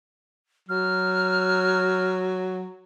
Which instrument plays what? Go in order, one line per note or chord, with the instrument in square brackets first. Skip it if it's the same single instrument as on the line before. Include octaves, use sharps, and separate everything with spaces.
[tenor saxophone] F#3 [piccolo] F6